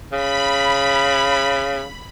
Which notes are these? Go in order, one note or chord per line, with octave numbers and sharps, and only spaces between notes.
C#3 B5